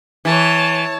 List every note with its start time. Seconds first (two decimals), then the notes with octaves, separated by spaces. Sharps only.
0.25 E3 C#5 A5